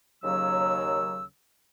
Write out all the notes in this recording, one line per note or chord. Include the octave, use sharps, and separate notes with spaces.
D#2 C#3 F#3 E6